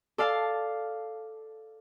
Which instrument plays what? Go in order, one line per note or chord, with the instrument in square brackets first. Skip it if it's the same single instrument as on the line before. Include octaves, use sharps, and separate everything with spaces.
[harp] A4 D5 F5 A5